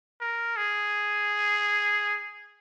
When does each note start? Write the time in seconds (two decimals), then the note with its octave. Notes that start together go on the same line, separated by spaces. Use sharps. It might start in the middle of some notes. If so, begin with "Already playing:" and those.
0.21 A#4
0.57 G#4